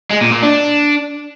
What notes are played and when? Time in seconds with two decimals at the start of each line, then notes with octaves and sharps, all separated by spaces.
0.10 G#3
0.21 A#2
0.32 A#2
0.43 D4